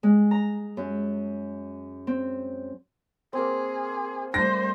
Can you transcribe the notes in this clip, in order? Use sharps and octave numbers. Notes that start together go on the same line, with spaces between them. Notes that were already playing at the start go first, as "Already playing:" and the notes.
G#3
A#5
F#2
C4
A#3 C4 G#4
G3 A3 C5 A#6